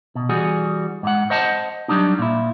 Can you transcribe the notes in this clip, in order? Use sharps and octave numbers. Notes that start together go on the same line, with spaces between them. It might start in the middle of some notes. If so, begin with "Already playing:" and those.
B2
E3 G3 F#4 G#4
G#2 F#5
C5 D#5 F#5 A5
F#3 G3 D4 D#4
A#2 E4